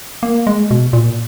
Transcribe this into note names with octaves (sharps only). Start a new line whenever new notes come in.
A#3
G#3
B2
A#2